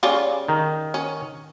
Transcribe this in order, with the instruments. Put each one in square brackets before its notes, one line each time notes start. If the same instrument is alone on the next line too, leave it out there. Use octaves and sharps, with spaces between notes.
[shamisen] C#3 G3 F4
[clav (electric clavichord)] D#3
[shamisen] C#4